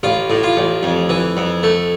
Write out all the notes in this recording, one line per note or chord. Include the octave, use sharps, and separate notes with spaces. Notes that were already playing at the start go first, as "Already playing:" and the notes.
A1 F4
A2
F4
A1
F2
E3
F2
A3